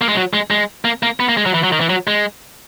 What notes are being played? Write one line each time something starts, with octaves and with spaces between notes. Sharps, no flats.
A#3
G#3
F#3
G#3
G#3
A#3
A#3
B3
A#3
G#3
F#3
E3
F#3
D#3
E3
F#3
G#3